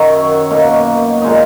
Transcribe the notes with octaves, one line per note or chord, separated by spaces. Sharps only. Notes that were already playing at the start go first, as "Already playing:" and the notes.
Already playing: F#2 D#3 F#3 C#5 E5 F#5
B2 A#3 D#4
A#2 G#3 D#4